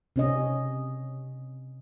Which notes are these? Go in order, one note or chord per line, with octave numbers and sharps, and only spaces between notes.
C3 C#4 D#5